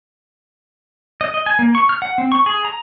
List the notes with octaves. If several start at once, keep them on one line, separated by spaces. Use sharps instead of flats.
D#5
D#5
G#5
A#3
C#6
F6
F#5
C4
C#6
G#4
A#5